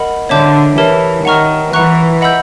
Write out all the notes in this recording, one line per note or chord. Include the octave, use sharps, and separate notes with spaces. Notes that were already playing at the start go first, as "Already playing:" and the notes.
Already playing: A#4 D#5 F#5 B5
D3 C#5 E5 A5 D6 G6
E3 G4 A#4 C#5 E5 A5
D#3 F#5 A#5 C#6 F6
E3 F#5 A#5 C#6 F#6
D#5 F#5 B5 E6 G6